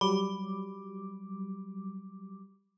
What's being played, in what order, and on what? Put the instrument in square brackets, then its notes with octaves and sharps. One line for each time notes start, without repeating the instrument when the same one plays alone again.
[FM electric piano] F#3 G3 D6 [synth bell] B5